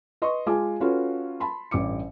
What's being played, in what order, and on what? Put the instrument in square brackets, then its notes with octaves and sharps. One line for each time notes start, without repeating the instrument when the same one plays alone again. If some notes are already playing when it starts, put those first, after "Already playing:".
[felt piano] B4 D#5 C6 C#6
G#3 F4 G#5 A5 D6
C#4 F4 F#4 A4 B4
A5 B5 C6
A1 G2 D6 C#7